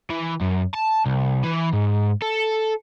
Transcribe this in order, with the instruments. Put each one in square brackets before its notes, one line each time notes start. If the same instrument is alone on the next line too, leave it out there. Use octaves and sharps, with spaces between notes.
[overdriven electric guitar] E3
F#2
A5
C2
E3
G#2
A4